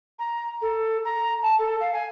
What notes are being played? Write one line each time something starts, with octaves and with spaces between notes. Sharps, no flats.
A#5
A4
A#5
A5
A4
F5
G#5